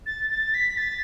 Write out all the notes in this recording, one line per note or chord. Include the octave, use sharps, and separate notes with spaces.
A6
A6
B6
A6